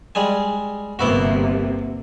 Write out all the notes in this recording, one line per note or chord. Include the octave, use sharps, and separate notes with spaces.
G3 G#3 G#5
G1 C3 A#3 B3 E4 F#4